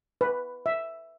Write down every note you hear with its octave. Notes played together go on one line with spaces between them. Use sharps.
B4
E5